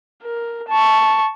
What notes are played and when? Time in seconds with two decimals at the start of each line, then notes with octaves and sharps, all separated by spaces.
0.23 A#4
0.68 A5 C#6